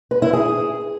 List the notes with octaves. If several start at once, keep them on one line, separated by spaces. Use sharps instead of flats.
B4
E4
G#4